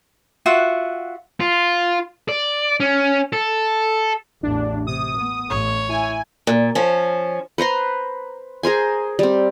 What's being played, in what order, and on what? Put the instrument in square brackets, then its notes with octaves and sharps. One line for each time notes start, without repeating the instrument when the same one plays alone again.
[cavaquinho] F4 F#4 E5 F#5
[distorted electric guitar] F4
D5
C#4
A4
[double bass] A1 E2 [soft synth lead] D4
[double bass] C3 [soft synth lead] D#6
[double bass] B3
[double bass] A1 [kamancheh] C#5
[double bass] E4 [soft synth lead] G#5
[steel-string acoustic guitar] A#2
F3 C#4
[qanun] B4 C5 A#5 C6
G#4 A#4 C5 G#5
G3 C4